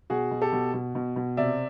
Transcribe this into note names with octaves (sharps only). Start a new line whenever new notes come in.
B2 F#4 G#4
B2
G4 A4
B2
B2
B2
B2
C3 D5 E5